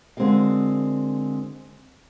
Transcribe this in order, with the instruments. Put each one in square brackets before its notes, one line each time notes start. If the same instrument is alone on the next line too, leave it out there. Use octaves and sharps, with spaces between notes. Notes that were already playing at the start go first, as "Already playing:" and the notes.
[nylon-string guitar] D3 G#3 C4 F#4 A#4 F5